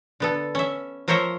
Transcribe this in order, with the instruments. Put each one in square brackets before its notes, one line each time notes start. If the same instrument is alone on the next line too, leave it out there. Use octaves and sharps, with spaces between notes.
[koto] D3 B3 A4
C#4 E5
F3 A#4 C5 C#5 E5 A#5